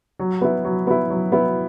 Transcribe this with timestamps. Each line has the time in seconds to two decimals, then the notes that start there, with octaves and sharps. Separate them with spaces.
0.20 F#3
0.41 B3 E4
0.65 F#3
0.87 B3 E4
1.10 F#3
1.32 B3 E4